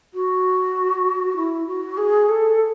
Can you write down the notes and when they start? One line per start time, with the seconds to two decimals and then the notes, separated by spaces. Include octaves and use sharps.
0.14 F#4
1.36 E4
1.67 F#4
1.98 G#4
2.29 A4